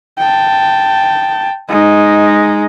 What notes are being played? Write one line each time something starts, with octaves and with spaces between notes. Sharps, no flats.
G5 A5
G#3 D#4